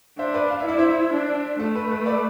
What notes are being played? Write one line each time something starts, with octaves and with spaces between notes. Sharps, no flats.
D4 C5 E5
B4 D5
F5
E5
E4 D5
C5 E5
D4
A3 A4
B4
B4
B4 D5